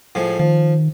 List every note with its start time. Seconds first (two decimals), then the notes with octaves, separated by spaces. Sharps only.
0.15 A2 F3 G#3
0.40 D#3 F3